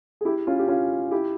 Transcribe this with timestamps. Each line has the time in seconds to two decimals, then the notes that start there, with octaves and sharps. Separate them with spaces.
0.21 G#4
0.25 E4 G4
0.47 C#4 F4
0.59 G4
0.68 C#4 F4
1.11 E4 G4